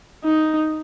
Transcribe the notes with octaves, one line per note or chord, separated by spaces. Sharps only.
D#4